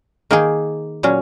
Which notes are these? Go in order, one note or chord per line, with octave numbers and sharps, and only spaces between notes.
D#3 A#3 D#4 G#4
A#2 F#3 C#4